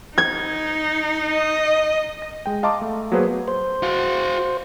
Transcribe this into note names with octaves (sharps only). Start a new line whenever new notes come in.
D#4 G#6
D#5
A#6
G#3 G5
D#5 F5 A5 A#5 C6 D6
A3
F#3 A#3 B3 G#4 B4 C5
C5
F#4 F5